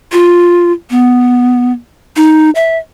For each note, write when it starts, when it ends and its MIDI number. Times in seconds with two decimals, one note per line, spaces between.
0.12 0.72 65
0.91 1.72 59
2.17 2.50 63
2.55 2.77 76